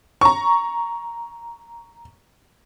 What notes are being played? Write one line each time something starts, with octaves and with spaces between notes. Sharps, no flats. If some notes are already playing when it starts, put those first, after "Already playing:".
A#5 C#6